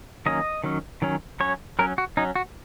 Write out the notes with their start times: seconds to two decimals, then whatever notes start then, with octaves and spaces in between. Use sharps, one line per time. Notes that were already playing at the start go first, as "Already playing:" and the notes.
0.26 D#3 F#3 A#3 C#4 D#5
0.64 D#3 F#3 C#4
1.02 D#3 F#3 C#4
1.40 F#3 C#4 C#5
1.79 F#3 C#4 A#4
1.98 F#4
2.17 F#3 C#4 D#4
2.36 F#4